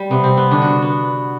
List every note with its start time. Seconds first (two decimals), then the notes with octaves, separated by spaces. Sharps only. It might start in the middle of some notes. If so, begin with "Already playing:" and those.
Already playing: G3 G4
0.10 C3 B3
0.24 C4
0.37 B3
0.51 D3 D4
0.62 F#4
0.82 B3